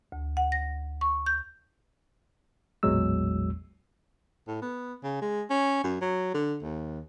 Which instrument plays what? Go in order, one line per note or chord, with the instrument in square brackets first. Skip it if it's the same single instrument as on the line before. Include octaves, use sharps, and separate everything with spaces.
[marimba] D2
F#5
A#6
C#6
G6
[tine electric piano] A1 E2 A#2 F#3 G#3 E6
[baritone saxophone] A2
B3
C#3
G#3
C#4
F#2
F#3
D3
D#2